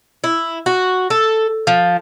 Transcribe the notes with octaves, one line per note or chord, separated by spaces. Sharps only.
E4
F#4
A4
F3